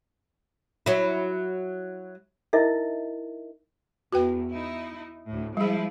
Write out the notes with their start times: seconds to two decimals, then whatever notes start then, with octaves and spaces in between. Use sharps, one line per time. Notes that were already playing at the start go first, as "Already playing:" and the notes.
0.86 F#3 E4
2.53 D#4 E4 A#4 D#5 E5
4.12 E2 F#4 B4 G5
4.51 D#4 E4
5.27 D2 A2
5.57 F3 G3 G#3 E4 G#4